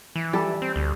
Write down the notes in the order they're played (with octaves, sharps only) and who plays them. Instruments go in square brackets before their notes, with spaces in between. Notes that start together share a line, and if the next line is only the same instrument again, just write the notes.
[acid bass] E3
[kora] G3 A4
[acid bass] C4
D2